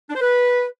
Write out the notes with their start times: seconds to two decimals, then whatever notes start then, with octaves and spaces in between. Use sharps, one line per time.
0.10 D4
0.16 C5
0.22 B4